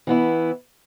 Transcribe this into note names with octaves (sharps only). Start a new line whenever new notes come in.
E3 B3 E4